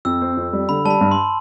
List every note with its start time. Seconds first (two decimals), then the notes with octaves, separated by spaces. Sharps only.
0.05 F2 E6
0.21 C4
0.37 F2
0.53 G3
0.69 D3 B5
0.85 G3 A5
0.90 B5
1.01 G2
1.11 C6